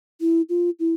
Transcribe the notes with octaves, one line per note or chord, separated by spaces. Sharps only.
E4
F4
E4